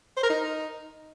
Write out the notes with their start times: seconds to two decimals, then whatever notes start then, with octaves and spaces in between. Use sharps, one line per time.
0.17 C5
0.23 A#4
0.30 D#4